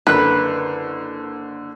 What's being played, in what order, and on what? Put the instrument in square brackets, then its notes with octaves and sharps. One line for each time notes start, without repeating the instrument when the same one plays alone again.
[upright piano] F#1 D3 F#6 [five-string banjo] B4